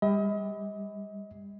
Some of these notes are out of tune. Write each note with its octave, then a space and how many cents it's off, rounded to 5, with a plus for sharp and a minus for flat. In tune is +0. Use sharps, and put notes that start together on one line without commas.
G3 +35 D#5 +40